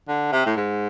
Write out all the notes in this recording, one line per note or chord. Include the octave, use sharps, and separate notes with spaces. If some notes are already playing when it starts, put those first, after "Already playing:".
D3
C3
A2
G#2